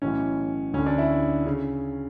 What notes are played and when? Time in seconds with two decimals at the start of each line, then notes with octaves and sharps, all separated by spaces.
0.02 B1 A2 E3 C#4
0.74 D2 C#4
0.78 D3
0.86 D4
0.98 E4
1.46 C#3